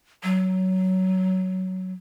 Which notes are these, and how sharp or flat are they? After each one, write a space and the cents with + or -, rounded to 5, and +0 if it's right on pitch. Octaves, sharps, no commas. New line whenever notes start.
F#3 +15